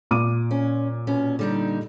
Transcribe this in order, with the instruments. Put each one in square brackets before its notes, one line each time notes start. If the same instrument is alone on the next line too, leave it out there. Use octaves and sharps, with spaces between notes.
[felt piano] A#2 D6 D#7
[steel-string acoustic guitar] C#4
B2 C#4
D3 G3 D#4